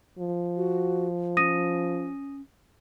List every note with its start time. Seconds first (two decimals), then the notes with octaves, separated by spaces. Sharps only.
0.18 F3
0.57 F#4
1.37 C#4 D#6 A#6 D#7